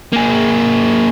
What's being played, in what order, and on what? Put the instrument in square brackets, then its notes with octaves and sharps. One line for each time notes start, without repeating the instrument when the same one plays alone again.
[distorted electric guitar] A#3 G#4